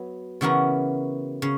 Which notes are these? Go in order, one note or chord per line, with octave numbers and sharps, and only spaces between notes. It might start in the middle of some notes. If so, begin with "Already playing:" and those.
Already playing: F#3 B3
C#3 E3 B3 F#4 A#4
C#3